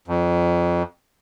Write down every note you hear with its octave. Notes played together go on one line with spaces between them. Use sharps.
F2